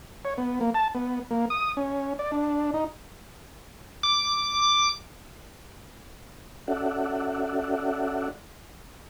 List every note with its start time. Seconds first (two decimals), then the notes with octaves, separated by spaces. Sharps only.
0.25 C#5
0.38 B3
0.61 A#3
0.74 A5
0.95 B3
1.31 A#3
1.50 D#6
1.77 C#4
2.19 D5
2.32 D4
2.74 D#4
4.03 D6
6.68 C#4 F#4 A4 D5 E5 F#5